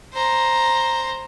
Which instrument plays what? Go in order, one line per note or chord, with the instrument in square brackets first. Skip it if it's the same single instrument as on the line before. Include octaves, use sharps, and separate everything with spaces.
[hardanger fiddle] C5 A#5